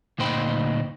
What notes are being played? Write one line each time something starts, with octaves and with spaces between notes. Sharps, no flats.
D2 A#2 D#4 C5 G5 B5